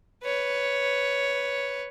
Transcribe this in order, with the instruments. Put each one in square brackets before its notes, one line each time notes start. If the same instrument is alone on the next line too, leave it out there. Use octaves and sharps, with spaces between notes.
[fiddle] B4 C#5